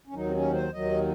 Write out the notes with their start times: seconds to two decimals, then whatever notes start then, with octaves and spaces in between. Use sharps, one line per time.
0.07 C#4
0.14 D#2 D#3 F#3 D#4
0.27 C4
0.34 C#4
0.53 C5
0.72 D#2 D#3 F#3 D#5